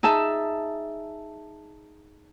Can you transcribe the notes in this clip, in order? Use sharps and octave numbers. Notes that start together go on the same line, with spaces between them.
D#4 G#4 E5 A5